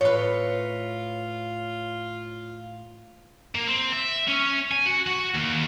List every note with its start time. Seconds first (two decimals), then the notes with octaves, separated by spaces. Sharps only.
0.01 A2 F4 B4 C#5
3.55 A#3
3.67 C4
3.92 E5
4.28 C#4
4.71 G#5
4.86 F#4
5.07 F#4
5.34 D#2